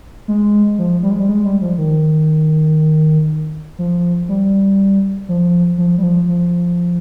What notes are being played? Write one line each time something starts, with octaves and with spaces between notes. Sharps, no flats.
G#3
F3
G3
G#3
G3
G#3
G3
F3
D#3
F3
G3
F3
F3
G3
F3
F3